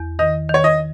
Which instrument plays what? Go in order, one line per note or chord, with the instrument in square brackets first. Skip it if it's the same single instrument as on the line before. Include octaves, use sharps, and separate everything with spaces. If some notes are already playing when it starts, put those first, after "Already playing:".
Already playing: [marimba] E2
[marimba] D#3 [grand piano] D#5
[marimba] D#3
[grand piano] C#5
D#5